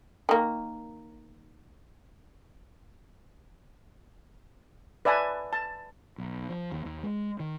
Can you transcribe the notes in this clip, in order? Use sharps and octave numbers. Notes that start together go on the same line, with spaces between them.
D#3 A#3
B4 D5 E5 G#5 A5
A5
B1
F3
D#2
D#2
G#3
D#3